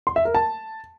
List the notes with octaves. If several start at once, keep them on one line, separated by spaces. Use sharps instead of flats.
C6
E5
A#4
A5